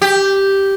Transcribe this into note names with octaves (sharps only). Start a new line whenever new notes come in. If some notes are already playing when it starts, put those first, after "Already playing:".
G4